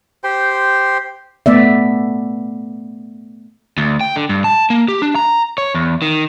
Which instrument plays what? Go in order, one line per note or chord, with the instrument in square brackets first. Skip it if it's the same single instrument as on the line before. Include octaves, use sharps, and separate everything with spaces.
[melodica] G4 C5 G5 C6
[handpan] A3 B3 D5 E5
[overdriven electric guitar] D2
G5
D3
G2
A5
A#3
G4
D4
A#5
C#5
E2
D#3